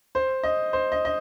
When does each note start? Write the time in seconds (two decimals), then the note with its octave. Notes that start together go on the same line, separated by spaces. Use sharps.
0.15 C5
0.43 D#5
0.73 C5
0.92 D#5
1.05 D#5